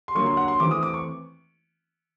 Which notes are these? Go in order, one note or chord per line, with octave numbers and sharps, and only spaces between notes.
C6
D3 F#3 A#3 C#6
C6
F#5
C6
E3 A3 C4 D6
D#6
D6
C#6